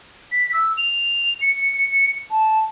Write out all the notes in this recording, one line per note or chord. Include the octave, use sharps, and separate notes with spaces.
B6
E6
F7
C#7
A5